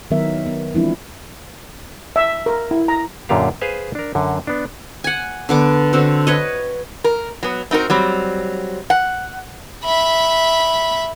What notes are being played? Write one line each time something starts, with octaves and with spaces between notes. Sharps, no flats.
D#3 F#3 B3 A#4 E5
B3
E3 F3 G#3 C4 D4 E4
E5
A#4
E4
A#5
F#2 A#2 D3 F4 G4 F5
G#4 B4 C5 F5 G#5
D4 A#4
F#2 D3
B3 D4
F#5 G#5
D3 B3 D6
D3 C4 F#4
B4 C#5 D#5
A#4
F#3 B3
C4 D#4 F#4 A#4
F#3 G3 C4
F#5
E5 B5